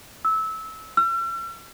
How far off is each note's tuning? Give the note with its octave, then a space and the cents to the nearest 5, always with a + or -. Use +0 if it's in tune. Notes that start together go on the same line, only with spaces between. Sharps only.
E6 -20
E6 +45